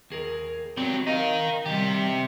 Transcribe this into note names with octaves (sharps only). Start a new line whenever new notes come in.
D#2 G#4 A#4
F#3 C4 G4
D#4 A#4 D#5 F5
C3 D#3 G3 G4